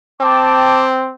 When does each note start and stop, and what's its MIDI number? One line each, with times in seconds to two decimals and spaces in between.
0.20 1.12 60
0.20 0.86 79
0.20 0.86 81
0.20 0.86 86